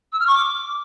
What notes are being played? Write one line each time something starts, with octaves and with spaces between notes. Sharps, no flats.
E6
F6
C#6
D6